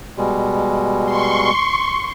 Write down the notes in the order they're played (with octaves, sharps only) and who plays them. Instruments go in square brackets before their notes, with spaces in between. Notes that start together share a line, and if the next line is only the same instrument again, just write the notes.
[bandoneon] B2 G3 G#3
[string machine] C6 C#6